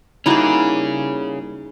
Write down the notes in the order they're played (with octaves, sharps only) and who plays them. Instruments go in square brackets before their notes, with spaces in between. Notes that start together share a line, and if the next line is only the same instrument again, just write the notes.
[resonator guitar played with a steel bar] G3 A#3 [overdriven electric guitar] C#4 G#4 [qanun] D#4 E4 F#4